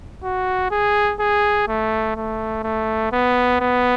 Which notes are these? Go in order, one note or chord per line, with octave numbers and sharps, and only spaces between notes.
F#4
G#4
G#4
A3
A3
A3
B3
B3